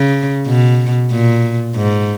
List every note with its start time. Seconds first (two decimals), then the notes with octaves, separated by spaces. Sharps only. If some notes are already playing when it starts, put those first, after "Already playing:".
Already playing: C#3
0.47 B2
1.11 A#2
1.76 G#2